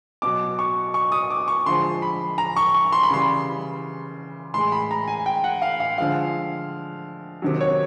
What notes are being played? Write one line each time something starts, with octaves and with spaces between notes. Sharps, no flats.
B2 F#3 D6
C#6
C#6
D#6
D6
C#6
D3 F3 G#3 C6
B5
A#5
C#6
C#6
C6
B5
C#3 E3 G3 C6
A2 E3 G#3 C6
B5
A#5
G#5
G5
F#5
F5
F5
D3 F3 G#3 F5
C3 D#3 F#3
C#5